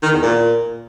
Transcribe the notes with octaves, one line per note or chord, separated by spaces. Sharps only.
D#3
E2
A#2